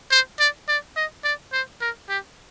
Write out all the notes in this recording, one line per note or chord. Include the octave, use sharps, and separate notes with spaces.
C5
D5
D5
D#5
D5
C5
A#4
G4